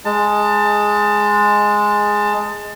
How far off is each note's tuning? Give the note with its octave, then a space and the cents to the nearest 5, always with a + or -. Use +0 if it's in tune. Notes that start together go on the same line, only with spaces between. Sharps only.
G#3 +0 A5 +25